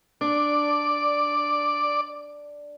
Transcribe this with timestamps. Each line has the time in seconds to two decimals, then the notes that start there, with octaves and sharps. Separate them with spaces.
0.21 D4 D5